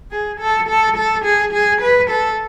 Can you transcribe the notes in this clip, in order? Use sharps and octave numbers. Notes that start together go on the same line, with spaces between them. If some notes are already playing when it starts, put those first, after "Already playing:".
G#4
A4
A4
A4
G#4
G#4
B4
A4